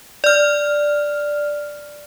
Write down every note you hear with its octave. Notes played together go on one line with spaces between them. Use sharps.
D5 F6